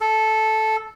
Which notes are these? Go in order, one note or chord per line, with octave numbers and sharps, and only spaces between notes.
A4